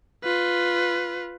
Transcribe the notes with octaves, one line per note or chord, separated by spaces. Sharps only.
F4 B4